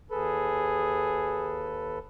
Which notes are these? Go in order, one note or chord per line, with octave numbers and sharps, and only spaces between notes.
D#2 G#4 A4 B4